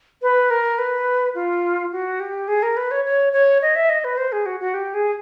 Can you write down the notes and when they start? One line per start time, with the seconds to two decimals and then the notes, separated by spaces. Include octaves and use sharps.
0.22 B4
0.50 A#4
0.79 B4
1.35 F4
1.92 F#4
2.20 G4
2.48 G#4
2.63 A#4
2.77 B4
2.91 C#5
3.05 C#5
3.33 C#5
3.62 D#5
3.76 E5
3.89 D#5
4.04 B4
4.18 C5
4.32 G#4
4.46 F#4
4.60 F#4
4.74 G4
4.94 G#4